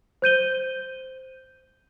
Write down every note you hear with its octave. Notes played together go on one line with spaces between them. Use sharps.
C5 G6 D#7 G7